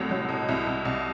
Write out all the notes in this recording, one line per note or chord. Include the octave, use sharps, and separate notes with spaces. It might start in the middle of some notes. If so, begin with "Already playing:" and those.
Already playing: C2 A2 F#3
F#3
B2
C2 E4
C2
C2